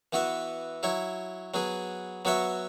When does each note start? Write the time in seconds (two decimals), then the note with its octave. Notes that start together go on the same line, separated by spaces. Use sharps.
0.13 E3 B3 F#4 E5
0.83 F#3 E4 C#5
1.54 F#3 B3 G#4
2.25 F#3 B3 F#4 C#5 E5